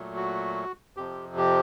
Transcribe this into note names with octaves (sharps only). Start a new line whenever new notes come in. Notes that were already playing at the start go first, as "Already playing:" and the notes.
Already playing: A#2 F#3 A3
F#4
F2 C3 F3 G4
G4